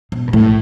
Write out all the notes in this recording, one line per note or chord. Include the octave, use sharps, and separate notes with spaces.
B2
G2
A2